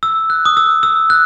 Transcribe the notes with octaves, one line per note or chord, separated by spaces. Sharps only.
E6
F#6
D#6
E6
E6
F#6